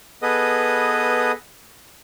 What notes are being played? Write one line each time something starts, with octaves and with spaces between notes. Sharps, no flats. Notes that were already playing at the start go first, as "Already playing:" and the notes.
B3 G#4 A4 B4 D#5 D#6